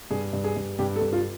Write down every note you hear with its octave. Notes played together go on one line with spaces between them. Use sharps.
G2 G#4
G2
G#4
G2
G2 G4
A4
G2
F4